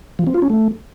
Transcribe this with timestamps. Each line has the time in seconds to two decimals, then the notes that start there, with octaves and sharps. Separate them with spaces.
0.19 F3
0.27 C4
0.34 F4
0.42 C#4
0.50 A3